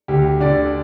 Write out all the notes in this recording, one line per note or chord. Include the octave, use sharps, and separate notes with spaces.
D2 G4
D3 D5